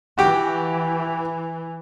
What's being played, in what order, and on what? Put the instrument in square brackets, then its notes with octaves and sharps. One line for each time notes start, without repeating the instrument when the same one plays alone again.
[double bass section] E3 [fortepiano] F#4 G4 G5